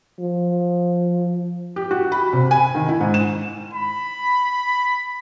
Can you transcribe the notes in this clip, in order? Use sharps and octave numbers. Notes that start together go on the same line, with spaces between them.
F3
G4
F#4
B5
C3
G#5
D#3
E4
G#2
E7
B5